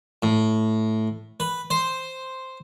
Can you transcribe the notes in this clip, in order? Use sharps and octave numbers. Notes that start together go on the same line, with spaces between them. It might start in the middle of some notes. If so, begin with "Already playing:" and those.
A2
B4
C5